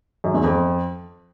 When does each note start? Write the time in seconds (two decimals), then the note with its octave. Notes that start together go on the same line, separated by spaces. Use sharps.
0.24 F#2
0.34 E2
0.44 F2